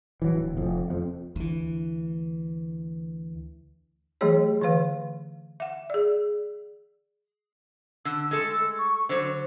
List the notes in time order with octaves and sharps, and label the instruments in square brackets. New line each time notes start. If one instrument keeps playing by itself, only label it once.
[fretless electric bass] E3 F#3
D1
F1 F2
F2
[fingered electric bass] D2 E3
[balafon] E3 F#3 A3 G4 G#4 C#5
D3 E3 B4 F5
E5 F#5
G#4 D5
[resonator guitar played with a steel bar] D3 [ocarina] E6
[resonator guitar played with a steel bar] G#3 A3 A4
[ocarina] C#6
[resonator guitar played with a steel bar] D3 F#3 [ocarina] C5